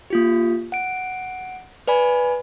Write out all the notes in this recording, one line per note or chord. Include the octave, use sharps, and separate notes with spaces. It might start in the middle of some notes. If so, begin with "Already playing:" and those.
A#3 F4 G4
F#5 D7
B4 D5 G#5 B5